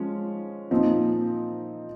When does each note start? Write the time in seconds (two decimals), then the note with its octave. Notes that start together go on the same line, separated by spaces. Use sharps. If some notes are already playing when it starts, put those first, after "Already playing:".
Already playing: F3 G#3 C#4
0.71 A#2 F3 C4 D#4